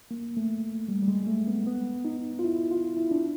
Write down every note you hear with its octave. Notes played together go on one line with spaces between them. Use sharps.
A#3
A3
G3
G3
G#3
A3
B3
B3
D#4
F4
E4
F4
E4
D4